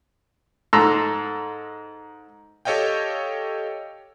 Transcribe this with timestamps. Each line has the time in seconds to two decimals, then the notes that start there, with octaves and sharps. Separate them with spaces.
0.73 G#2 A4 A#5 C6 E6
2.65 G4 A4 C#5 D#5 F5 G5